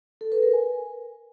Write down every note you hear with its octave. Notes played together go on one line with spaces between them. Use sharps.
A4
B4
A#4
G#5